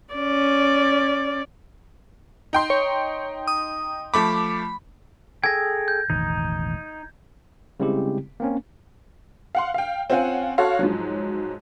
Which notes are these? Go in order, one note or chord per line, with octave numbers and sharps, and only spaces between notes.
C#4 D5
D#4 G5 C6
C#5
D#6
F3 A3 B5 D6
G#4 A4 G5 G#6 A#6
G6
E1 A1 D#3 D#4
C#3 G3 G#3 C4 E4 G4
A#3 C4 C#4
F5 F#5 C6
F5 G5
C4 C#4 F4 F5 F#5 G#5
F#4 A4 C#5 F5 C6
G#2 F3 F#3